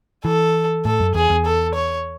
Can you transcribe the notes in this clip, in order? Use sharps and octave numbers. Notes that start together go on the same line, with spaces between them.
E3 A4
A2 A4
F#2
E2 G#4
E2
A4
C#5